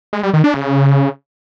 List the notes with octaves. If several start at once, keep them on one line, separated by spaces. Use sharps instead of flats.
G#3
G3
D#3
D4
C#3